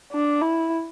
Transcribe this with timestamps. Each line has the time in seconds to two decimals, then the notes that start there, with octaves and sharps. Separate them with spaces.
0.12 D4
0.41 E4